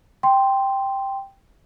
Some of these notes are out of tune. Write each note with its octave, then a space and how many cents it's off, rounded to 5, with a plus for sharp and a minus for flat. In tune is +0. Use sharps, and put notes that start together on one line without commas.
G5 +0 C6 +0